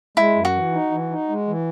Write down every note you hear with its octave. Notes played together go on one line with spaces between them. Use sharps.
G#3 E4
F#2
F#4
E3
D#4
E3
D#4
G#3
E3